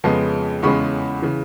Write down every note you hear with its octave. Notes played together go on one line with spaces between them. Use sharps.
F2 C#3 F3 G#3 B3
E2 C#3 E3 G#3 C#4 B5 C#6
C#3 E3